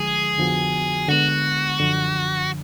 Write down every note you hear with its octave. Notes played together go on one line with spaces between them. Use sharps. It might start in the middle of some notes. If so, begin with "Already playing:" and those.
Already playing: D3 F3 G#3 G#4
F2 D3 F3 B3 F#4
D3 G#3 B3 F#4
F#2 D3 F3